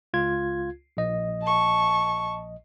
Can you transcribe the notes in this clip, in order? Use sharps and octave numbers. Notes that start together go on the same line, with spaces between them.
C#2 F4 G#6
A#1 D#5
A5 C#6